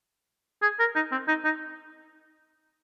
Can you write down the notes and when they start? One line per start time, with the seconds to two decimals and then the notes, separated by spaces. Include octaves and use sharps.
0.62 G#4
0.80 A#4
0.96 D#4
1.12 C4
1.28 D#4
1.45 D#4